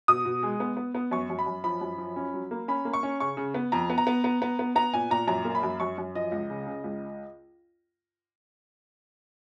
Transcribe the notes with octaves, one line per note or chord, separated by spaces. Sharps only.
B2 D#6
B2
G#3
B3
B3
B3
F#2 C#6
F#2
B5
F#2
F3 B5
F#2
F3
C#4
F#3
A#3
C#4 B5
A#3
C#6
C#4
C#3 C#6
C#3
B3
F2 A#5
B3
A#5
B3
B3
B3
B3
B3 A#5
A#2 G#5
A#2 A#5
F#2 A#5
A#3
B5
F#2
F#2 C#6
F#2
F3 D#5
C#2
C#3
C#3
C#2